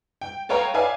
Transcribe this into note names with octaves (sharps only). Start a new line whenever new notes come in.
G5
A4 B4 C#5 F5 G5 A#5
B4 D5 E5 F5 G#5